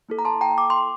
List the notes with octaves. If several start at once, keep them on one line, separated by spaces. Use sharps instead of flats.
A#3 E4 A4
A#5
A5 C6
G5 A#5
D6
C6